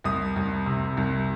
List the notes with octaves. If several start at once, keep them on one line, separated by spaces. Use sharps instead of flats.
C2 D#6
C2
C3
C2